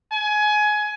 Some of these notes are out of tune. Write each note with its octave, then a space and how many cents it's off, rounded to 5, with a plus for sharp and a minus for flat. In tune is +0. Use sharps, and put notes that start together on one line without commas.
G#5 +20